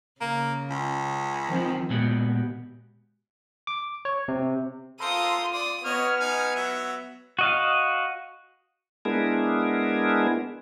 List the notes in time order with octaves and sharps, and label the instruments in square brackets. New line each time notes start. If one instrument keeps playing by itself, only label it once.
[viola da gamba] C#3 [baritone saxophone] A#3
[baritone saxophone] C#2
[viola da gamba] D#3 F3 C4
[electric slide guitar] A#2 G#3 B3 F#4 G4
[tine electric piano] D6
C#5
C3
[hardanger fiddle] F4 D#6 [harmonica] A4 A#4 C5 [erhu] C6
[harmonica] D5 [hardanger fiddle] D#6
[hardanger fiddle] B3 [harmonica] C#5 D#5 [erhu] F6
[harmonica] D#4 G#5
F#3 E5
[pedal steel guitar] F#4 D#5 F5
[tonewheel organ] G#3 B3 D4 E4 G#4 A#4